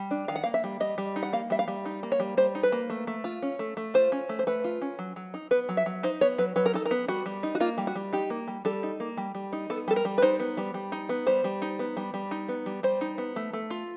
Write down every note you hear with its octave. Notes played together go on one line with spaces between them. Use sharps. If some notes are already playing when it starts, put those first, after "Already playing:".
Already playing: G3
D4
D#3 F5
F#5
A#3 F5
E5
G3
G3 D#5
G3
D#4
F#5
A#3 F5
G3 E5
F5
G3
D#4
A#3
C#5
G3
G3 C5
D#4
B4
A#3
A3
A3
F4
C#4
A3
A3
F4 C5
C#4
A3
C5
A3 B4
F4
C#4
F#3
F#3
D#4
B3 B4
F#3
E5
F#3
D#4 C5
B3 C#5
F#3 B4
F#3 B4
A#4
D#4 A4
A#4
B3
G3 F#4
G3
D#4
F#4
A#3 F4
G3
F#4
G3
D#4 G4
A#3
G3
G3 A4
D#4
A#3
G3
G3
D#4
B3 A4
G3 A4
A#4
G3
B4
D#4 C5
B3
G3
G3
D#4
B3
G3 C5
G3
D#4
B3
G3
G3
D#4
B3
G3
G3 C5
D#4
B3
A3
A3
F4